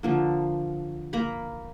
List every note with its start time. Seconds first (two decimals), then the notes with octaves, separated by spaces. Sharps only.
0.03 D3 F3 A#3
1.13 A#3 A#5 B5